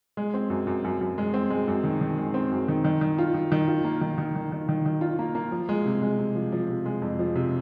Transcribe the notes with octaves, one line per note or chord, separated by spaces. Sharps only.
G#3
C4
F#2
F#2
F#2
F#2
G#3
C4
G#3
F#2
D#3
D#3
G#3
C4
F#2
D#3
D#3
D#3
F4
D#3
D#3
F4
A#3
D#3
D#3
D#3
D#3
D#3
D#3
F4
A#3
A#3
F3
G#3
C3
G#3
C3
F3
F3
C3
G#3
F2
F3
C3